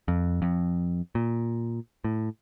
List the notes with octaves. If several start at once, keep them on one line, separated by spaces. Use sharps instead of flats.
F2
F2
A#2
A2